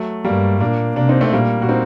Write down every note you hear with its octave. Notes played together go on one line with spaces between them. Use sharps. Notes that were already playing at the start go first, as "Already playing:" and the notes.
Already playing: F#3 A3
G2 G3 A#3
A#2 A#3 D4
C3 A#3 D4
C4 D#4
A3 C4
A#2 G3 A#3
F#4
C4 D#4